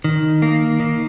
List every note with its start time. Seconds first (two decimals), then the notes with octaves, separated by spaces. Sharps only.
0.04 D#3
0.42 A#3
0.80 D#3